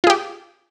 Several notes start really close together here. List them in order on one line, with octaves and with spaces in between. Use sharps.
F4 G#4 G4